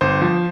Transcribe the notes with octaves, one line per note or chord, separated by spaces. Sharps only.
G1 C5
F3